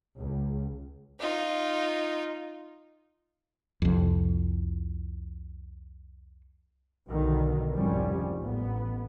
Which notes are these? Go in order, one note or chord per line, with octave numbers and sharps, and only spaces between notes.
C#2
D#4 F4
C2 F2
B1 B2 D3 D#3
F1 C2 G#2 F3 G3 C#4
A1 B3